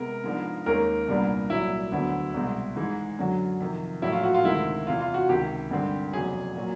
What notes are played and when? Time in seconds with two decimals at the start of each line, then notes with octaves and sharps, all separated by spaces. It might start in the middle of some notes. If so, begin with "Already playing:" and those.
Already playing: C3 G#3 B3 A#4
0.24 G#2 F3 G#3 B3 D4
0.66 D#2 D#3 G#3 C#4 A#4
1.08 C2 A#2 G3 B3 D4
1.50 C2 A#2 F#3 E4
1.92 D2 D3 F#3 B3
2.34 C2 B2 G#3 C4
2.76 G#2 E3 G#3
3.19 F#2 D3 F#3
3.60 F2 C3 D#3
4.02 A#1 A2 F#3 E4
4.12 F4
4.24 F#4
4.34 F4
4.44 D2 C3 D#3 G#3 E4
4.86 E2 C3 E3 F4
5.01 F4
5.14 F#4
5.29 C#2 C3 D#3 G4
5.71 G#1 G2 D3 G3 C4
6.13 F1 E2 C#3 F#3 G#4
6.57 A#2 F#3